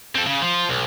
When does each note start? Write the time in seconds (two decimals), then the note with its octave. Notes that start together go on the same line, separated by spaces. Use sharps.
0.15 C4 A4
0.27 C#3
0.42 F3 F4
0.69 B1